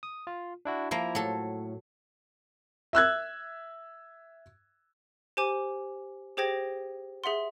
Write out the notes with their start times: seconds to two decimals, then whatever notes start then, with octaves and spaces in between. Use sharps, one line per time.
0.03 D#6
0.27 F4
0.65 D4 E4 F#4
0.91 F3 A#3 E4 A#5
1.15 A2 F#3 A4
2.93 E5 E6 F#6 G#6
5.37 G4 C5 G#5 D6
6.37 G4 G#4 C5 G5 G#6 A#6
7.24 G#4 E5 F#5 C6